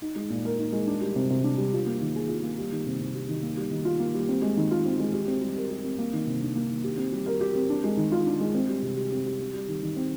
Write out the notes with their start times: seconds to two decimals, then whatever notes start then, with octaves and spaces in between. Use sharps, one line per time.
0.02 D#4
0.16 G#3
0.30 A#2
0.45 A#4
0.59 D#4
0.73 G#3
0.87 D4
1.01 G3
1.16 C3
1.30 C3
1.44 D4
1.58 G3
1.73 F4
1.86 A#3
2.01 D#3
2.16 G#4
2.29 F4
2.43 A#3
2.58 G3
2.72 D#3
2.86 C3
3.01 C3
3.15 G3
3.29 D#3
3.43 A#3
3.57 G3
3.71 D#3
3.85 F4
4.00 A#3
4.15 G3
4.29 C4
4.42 G#3
4.57 D#3
4.71 F4
4.85 C4
4.99 G#3
5.13 G4
5.28 C4
5.42 G3
5.56 A#4
5.70 G4
5.84 C4
5.98 A#3
6.13 D#3
6.27 C3
6.41 D4
6.56 A#3
6.70 D#3
6.84 G4
6.98 C4
7.12 G3
7.26 A#4
7.41 G4
7.55 C4
7.70 D4
7.84 G#3
7.97 D#3
8.12 F4
8.26 D4
8.40 G#3
8.54 C4
8.69 G3
8.83 C3
8.97 G4
9.12 C4
9.26 G3
9.40 C4
9.53 G3
9.68 D#3
9.83 D#3
9.96 C4